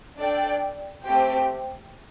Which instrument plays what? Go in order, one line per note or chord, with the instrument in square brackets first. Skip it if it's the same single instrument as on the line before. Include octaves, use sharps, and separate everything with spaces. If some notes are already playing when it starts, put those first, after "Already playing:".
[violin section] D4 A4 D5 G5
A3 C4 G4 C5 G5